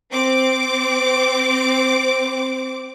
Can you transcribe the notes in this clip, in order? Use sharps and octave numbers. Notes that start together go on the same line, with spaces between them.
C4 D6